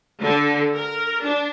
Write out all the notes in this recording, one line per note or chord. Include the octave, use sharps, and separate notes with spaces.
D3
A#4
D4